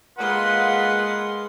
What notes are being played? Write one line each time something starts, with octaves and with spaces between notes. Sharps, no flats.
G#3 A#3 F4 B4 F#5 C6